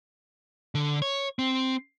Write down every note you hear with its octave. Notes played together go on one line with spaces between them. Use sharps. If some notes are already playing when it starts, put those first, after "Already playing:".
D3
C#5
C4